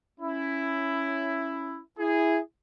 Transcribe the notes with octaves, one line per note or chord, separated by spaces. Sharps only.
C#4 E4
E4 G#4